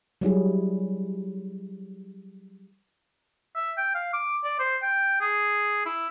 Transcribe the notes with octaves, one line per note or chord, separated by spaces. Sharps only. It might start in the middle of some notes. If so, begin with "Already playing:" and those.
F#3 G3 E4 G#4
E5
G5
F5
D6
D5
C5
G5
G#4
E4